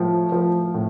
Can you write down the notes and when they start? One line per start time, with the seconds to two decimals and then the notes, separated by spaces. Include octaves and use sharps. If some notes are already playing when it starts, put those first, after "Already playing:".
Already playing: A2 F3
0.32 F3
0.74 A2